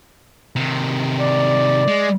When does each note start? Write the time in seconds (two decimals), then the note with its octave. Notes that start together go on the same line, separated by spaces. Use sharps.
0.56 C3 D#3
1.19 D5
1.87 G#3